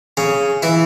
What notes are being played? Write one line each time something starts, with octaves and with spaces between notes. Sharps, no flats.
C#3 C#4
E3 E4